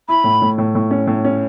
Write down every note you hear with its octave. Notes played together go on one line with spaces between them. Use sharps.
E4 B5
A2
A2
A2
A2
C#4
A2
C#4